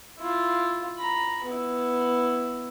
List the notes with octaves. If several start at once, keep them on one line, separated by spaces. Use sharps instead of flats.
E4 F4
A#5 B5
B3 E4